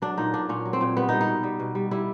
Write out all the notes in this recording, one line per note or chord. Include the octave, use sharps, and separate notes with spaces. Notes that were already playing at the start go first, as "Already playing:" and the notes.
F#3 D4
A#2 D#4
A#2 D4
A#2 C#4
F#3
C4
A#2
G3 B3
G3 D#4
D#4
B2
G3
B2
G3
G3 E4